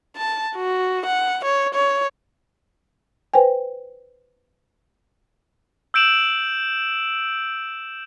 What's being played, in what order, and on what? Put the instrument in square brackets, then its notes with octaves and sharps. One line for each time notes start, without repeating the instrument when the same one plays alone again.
[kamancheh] A5
F#4
F#5
C#5
C#5
[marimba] B4 C5 G5 G#5
[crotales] E6 G6 D7 E7 F#7